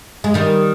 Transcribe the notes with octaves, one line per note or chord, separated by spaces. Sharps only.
G#3
D#3 G3